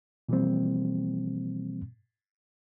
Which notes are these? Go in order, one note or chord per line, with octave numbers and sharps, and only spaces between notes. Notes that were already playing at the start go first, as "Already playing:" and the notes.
B2 E3 F3 G3 A#3 C4